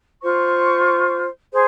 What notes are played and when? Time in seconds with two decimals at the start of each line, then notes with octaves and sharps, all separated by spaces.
0.21 F4 C5 C#6
1.52 G#4 C5